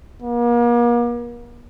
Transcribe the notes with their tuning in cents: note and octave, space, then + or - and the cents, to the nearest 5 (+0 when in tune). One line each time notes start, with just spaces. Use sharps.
A#3 +40